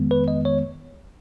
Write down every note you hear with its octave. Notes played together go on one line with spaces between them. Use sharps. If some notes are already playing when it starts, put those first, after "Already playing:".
Already playing: F2 D#3 G#3 B3
B4
D#5
C#5